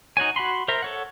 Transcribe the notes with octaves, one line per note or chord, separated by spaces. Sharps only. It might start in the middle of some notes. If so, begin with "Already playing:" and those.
D#4 F#4 C#5 G#5
F#4 F#5 B5 C6
A#4 C5 E5 A#5
A4 C#5 F#5